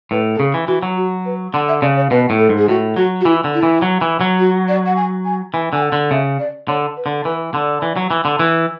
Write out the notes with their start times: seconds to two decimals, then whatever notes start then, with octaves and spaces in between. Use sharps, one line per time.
0.11 A2 B4
0.35 A4
0.39 C#3 G#4
0.54 E3
0.68 E3 F#4
0.83 F#3
0.97 F#4
1.26 B4
1.53 D3 F#5
1.68 E5
1.82 C#3 D5
1.97 C#5
2.11 B2 B4
2.30 A2
2.39 A4
2.49 G#2
2.58 G#4
2.68 A2 F#4
2.96 F#3 F#4
3.21 F#4
3.25 E3 E4
3.44 D3
3.54 E4
3.63 E3
3.82 F#3
4.01 E3
4.21 F#3
4.40 F#4
4.69 D5
4.86 F#5
4.96 G#5
5.25 G#5
5.53 E3 G#5
5.73 D3 G#5
5.82 F#5
5.92 D3
6.11 C#3 E5
6.40 D5
6.68 D3 C#5
6.97 B4
7.06 D3
7.25 E3 B4
7.53 D3 D5
7.82 E3
7.96 F#3
8.11 E3
8.25 D3
8.39 E3